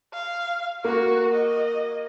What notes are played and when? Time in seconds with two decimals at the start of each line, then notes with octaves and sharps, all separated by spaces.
0.13 F5
0.84 A#3 F#4
1.33 D#5